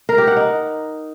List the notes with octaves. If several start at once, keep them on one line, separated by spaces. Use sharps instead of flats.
A#4
G4
F#5
D#4